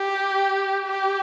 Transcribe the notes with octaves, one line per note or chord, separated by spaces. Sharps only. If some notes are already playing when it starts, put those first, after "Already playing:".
Already playing: G4
G4